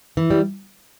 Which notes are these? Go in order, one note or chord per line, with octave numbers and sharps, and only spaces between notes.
E3
G3